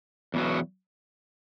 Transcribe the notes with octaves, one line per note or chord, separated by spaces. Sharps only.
E2 B2 F#3